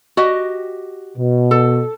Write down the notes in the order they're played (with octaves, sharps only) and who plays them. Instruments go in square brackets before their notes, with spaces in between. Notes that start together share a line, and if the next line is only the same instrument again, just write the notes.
[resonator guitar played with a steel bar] F#4 G4 D#5
[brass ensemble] B2
[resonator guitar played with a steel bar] A4